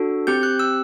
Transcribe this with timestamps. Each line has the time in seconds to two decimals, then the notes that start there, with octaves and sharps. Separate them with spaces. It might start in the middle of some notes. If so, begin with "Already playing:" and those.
Already playing: D4 F#4 A4
0.27 C4 G4 G6
0.43 F#6
0.59 E6